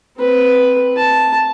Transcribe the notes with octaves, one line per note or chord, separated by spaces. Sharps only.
C4 B4
A5